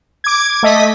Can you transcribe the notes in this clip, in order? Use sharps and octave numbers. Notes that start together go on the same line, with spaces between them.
D6 G#6
A3 D#5 B6